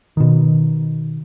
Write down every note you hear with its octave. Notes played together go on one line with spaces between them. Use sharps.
B2 D#3